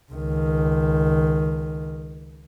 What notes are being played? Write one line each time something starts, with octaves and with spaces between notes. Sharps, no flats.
C#2 D#3